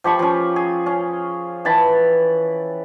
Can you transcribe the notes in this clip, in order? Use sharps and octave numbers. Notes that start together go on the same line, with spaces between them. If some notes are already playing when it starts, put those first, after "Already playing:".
F3 G4 B5 C#6
F3 C#4
G#4
C#4
E3 G5 A5 B5